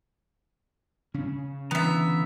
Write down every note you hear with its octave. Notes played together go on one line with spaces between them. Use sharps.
C#3 C#4
D3 E3 B3 E5 A#5